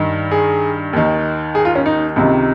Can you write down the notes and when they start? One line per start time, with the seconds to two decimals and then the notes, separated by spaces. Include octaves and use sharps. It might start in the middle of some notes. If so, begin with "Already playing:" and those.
Already playing: G2 D#3
0.31 G#4
0.93 D#2 D#3
1.55 G#4
1.65 F4
1.75 C#4
1.86 D#4
2.16 C#2 C3 D#3